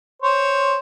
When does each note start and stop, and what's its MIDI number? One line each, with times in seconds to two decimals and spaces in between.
0.22 0.78 72
0.22 0.78 73